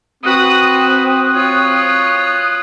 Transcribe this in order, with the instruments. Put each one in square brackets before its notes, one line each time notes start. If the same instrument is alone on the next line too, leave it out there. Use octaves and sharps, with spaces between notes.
[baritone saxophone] C4 [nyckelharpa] F#4 B4 [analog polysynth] D#6 F#6
[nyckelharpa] F4 C#5